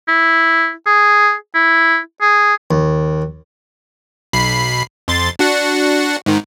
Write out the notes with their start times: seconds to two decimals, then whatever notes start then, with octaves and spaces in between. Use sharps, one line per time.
0.08 E4
0.86 G#4
1.54 E4
2.21 G#4
2.71 D#2
4.33 B1 B5 C7
5.08 F2 C6 A6
5.39 D4 F#4 F#5
6.26 G#2 D#3